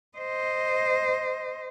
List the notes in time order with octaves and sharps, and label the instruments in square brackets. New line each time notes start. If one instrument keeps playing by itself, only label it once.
[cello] C5 D#5